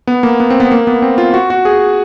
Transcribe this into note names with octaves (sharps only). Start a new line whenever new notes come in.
B3
A#3
B3
C4
B3
A#3
B3
C4
F4
F#4
F#4
G#4